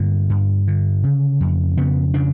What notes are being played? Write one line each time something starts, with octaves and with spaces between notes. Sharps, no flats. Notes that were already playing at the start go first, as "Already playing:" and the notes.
Already playing: G2 D3 A#3
G2
D3
C#3
F2
C#3 B3
C#3 D4